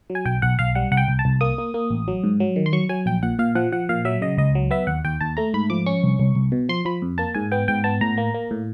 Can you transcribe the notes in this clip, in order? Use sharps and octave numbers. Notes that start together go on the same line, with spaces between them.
F#3
G#5
B1 G5
B1 F#5
B1 F5
G3 F#5
C2 F#5
G5
C2
A5
C2
A#3 D#6
A#3
A#3
A1
F#3
G#2
F#3
D#3
C6
F#3 C#6
F#3 G#5
A#1 G5
A#2 F#5
A#2 F5
F3 F#5
F3 F#5
A#2 F5
F#3 E5
C#3 D#5
C#2 D#5
F#3
B3 E5
D#2 F#5
D#2 G5
D#2 A5
A3 A#5
G#2 B5
F3 D6
C#4 C#6
C2
C2
C2
B2
F3 C6
F3 B5
F2
A#3 A5
G#2 G#5
B3 G5
G#2 G5
B3 A5
A2 A#5
A#3
A#3
A2